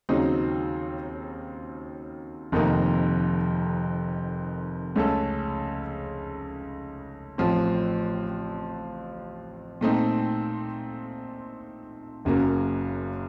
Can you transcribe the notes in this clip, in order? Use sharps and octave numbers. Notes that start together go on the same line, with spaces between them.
D#2 C#3 F#3 C4 D#4
F1 F2 D#3 A#3 D#4
C#2 C#3 A3 C#4 A4
A1 A2 F3 C4
A#2 A3 C4 D#4
F#1 F#2 C#3 F#3 A#3